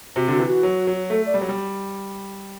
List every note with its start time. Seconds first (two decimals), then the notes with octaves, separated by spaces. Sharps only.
0.16 C3 F#4
0.28 D3 F#4
0.39 E3
0.47 F#4
0.63 F#3
0.87 F#3
1.10 A3 A4
1.26 D5
1.34 G3
1.41 F#3
1.49 G3